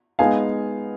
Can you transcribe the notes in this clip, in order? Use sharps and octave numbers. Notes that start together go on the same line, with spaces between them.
G#3 B3 D#4 F5 G#5